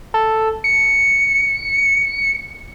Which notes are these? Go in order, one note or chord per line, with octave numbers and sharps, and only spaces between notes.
A4
C#7